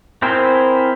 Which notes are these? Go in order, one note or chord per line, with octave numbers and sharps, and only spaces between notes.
C4 E4 G#4 A#4 C5